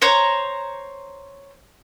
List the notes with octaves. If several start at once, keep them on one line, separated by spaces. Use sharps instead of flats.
C5 C#5 A#5